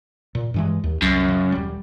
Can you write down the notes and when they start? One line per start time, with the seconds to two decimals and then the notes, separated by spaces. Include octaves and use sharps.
0.35 A#2
0.54 G2 E3 G#3
0.84 D#2
1.02 C2 F#2
1.28 C#3
1.52 D#1 G3